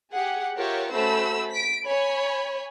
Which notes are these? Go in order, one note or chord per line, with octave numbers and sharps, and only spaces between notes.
G4 G#4 F#5
F4 G4 A#4 C#5 E5 F#5
A3 C#4 F#4 C5 B5 E6
B6 D7
C#5 G#5 B5